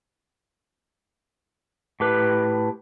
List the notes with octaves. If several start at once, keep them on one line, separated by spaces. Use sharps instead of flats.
A2 G4 B4